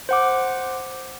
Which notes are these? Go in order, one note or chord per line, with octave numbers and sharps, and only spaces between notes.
C5 F#5 D6